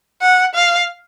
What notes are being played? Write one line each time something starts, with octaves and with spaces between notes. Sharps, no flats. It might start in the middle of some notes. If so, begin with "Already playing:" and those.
F#5
F5